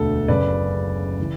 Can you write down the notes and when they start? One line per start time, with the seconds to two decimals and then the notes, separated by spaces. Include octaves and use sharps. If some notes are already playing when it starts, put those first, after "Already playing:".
Already playing: E1 D2 D3 A3 A4
0.28 F#1 F#2 C#3 B4 D5
1.20 C#3 E3